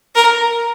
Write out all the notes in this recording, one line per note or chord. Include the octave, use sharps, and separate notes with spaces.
A#4